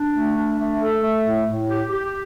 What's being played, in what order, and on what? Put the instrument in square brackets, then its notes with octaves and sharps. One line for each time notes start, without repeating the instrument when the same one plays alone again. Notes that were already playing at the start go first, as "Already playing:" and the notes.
Already playing: [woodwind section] D4
A3
D4
A3
A4
A3
A2
A2
G4
G4